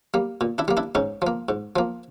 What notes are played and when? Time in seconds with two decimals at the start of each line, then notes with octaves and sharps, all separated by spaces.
0.14 G3 A#3
0.41 A#2
0.58 D4 E4
0.68 G3 A#3
0.77 D4 E4
0.95 G#2 C#4 D#4
1.22 F3 A#3
1.49 G#2
1.76 F3 A#3